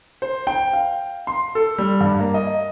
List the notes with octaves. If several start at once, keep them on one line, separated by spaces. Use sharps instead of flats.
C5
G5
F5
C6
A4
G3
G2
A#3
D#5